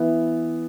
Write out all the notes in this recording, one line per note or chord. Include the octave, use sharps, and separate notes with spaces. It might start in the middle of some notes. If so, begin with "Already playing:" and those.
Already playing: E3 B3 E4